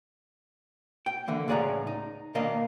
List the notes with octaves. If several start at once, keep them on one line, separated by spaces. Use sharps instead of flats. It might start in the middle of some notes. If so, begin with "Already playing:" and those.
G5
D3 E3 A#3
C#2 A2 G#4 D5 F#5 A#5
D#4
B2 D#3 A#3 D4 D#5